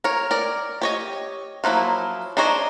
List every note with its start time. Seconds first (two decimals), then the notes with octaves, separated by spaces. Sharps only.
0.04 A#4 C#5
0.31 A#4 D5
0.82 G4 C#5 D#5
1.64 F3 F#3 A#3 E4
2.37 D4 D#4 C5 C#5 D#5